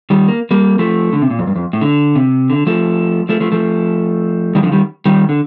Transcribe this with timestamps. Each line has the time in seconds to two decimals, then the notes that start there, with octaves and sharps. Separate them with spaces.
0.10 D#3 G3
0.28 A#3
0.51 G3 A#3
0.79 F3 A3
1.13 D3
1.22 C3
1.30 A#2
1.39 F2
1.47 G2
1.56 F2
1.73 A2
1.81 D3
2.15 C3
2.50 D3
2.67 F3 A3
3.29 F3 A3
3.40 F3 A3
3.52 F3 A3
4.55 D#3 G3
4.63 D3 F3
4.72 D#3 G3
5.06 D#3 G3
5.29 D3